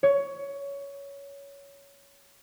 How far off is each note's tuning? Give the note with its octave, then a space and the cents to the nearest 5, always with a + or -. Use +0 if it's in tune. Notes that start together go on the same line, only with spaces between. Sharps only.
C#5 +15